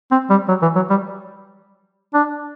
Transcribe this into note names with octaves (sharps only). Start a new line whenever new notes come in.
C4
G3
F#3
E3
F#3
G3
D4